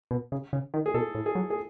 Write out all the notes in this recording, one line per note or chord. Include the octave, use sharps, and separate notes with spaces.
B2
C#3
C#3
D#3
G#4
B2 A4
A2
G#4
F#3
G#4